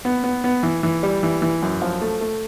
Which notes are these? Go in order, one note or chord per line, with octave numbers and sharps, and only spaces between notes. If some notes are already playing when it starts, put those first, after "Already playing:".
B3
B3
B3
E3
E3
G3
E3
E3
F#2
F3
A3
A3